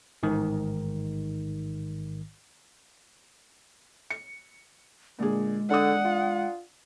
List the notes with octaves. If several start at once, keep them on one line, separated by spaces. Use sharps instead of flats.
A1 G#2 D#3
C#7
A#2 D3 G#3 G#4
D3 D4 F#5 D#6
F4